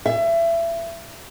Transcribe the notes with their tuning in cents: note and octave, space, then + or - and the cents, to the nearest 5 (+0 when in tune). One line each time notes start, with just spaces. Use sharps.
E5 +25